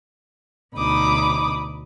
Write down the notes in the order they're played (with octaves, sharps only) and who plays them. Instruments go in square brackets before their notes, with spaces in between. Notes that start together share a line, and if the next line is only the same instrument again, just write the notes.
[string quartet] D2 B2 D#4 B5 D6 D#6